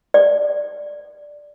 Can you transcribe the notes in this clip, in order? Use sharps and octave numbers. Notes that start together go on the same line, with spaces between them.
D5